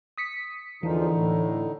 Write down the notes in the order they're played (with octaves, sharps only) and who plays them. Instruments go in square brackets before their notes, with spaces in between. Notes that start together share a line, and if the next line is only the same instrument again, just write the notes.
[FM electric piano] D#6 B6 C#7
[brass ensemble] E2 A#2 F3 [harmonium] D3 D#4 [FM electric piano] E3
[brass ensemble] A2